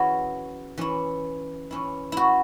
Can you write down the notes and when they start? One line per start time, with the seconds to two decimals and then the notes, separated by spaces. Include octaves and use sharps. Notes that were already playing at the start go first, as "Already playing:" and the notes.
Already playing: E3 C#4 E4 F#4 G#4
0.78 E3 C#4 E4
1.71 E3 C#4 E4
2.12 E4 F#4